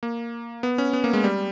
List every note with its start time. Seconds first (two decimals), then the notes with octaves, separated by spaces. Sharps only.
0.03 A#3
0.63 B3
0.78 C#4
0.93 B3
1.04 A#3
1.13 G#3
1.24 G3